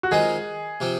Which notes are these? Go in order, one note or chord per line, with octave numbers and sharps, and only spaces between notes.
F#4
D#3 G#3 C4 F4 G#4
C3 F3 C4